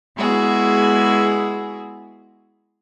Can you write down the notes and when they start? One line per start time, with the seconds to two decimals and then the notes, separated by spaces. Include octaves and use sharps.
0.16 G#3 B3 E4 F#4 G#4